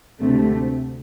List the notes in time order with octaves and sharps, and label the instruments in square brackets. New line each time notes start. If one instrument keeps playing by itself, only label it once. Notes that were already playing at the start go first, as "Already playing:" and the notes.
[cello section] D2 C3 A3